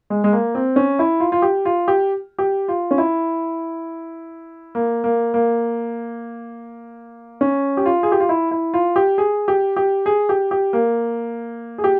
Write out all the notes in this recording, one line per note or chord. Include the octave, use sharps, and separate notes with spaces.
G#3
G#3
A#3
C4
C#4
E4
F4
F4
G4
F4
G4
G4
F4
C#4
E4
A#3
A#3
A#3
C#4
G4
F4
G#4
G4
F4
E4
E4
F4
G4
G#4
G4
G4
G#4
G4
G4
A#3
G#4
G4